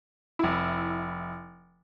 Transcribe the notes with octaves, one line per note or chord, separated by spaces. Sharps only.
F1 E4